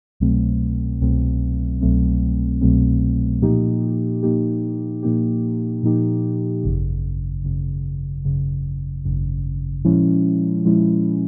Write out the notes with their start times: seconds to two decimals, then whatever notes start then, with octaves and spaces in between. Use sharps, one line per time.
0.20 C2 B2 F#3 A3 C4
1.01 C2 B2 F#3 A3 C4
1.81 C2 B2 F#3 A3 C4
2.61 C2 B2 F#3 A3 C4
3.42 A#2 F3 A#3 D#4 G4
4.23 A#2 F3 A#3 D#4 G4
5.03 A#2 F3 A#3 D#4 G4
5.83 A#2 F3 A#3 D#4 G4
6.63 G#1 F#2 C#3
7.44 G#1 F#2 C#3
8.24 G#1 F#2 C#3
9.05 G#1 F#2 C#3
9.85 A#2 F3 G#3 C#4 E4
10.65 A#2 F3 G#3 C#4 E4